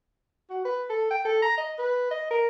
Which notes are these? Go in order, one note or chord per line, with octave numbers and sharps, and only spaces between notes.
F#4
B4
A4
G5
A4
A#5
D#5
B4
D#5
A#4